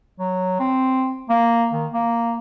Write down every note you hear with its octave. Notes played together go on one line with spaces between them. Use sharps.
F#3
C4
A#3
D#3
A#3